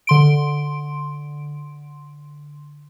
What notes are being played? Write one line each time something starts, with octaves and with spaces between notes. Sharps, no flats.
D3 C6 D7